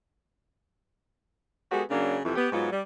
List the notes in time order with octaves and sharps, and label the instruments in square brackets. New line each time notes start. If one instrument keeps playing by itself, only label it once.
[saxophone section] G#3 B3 F#4 G4 A4
C#3 F#3 A#3 D4
F2 C3 E3
B3 G4
G#2 F#3 B3 F4
G3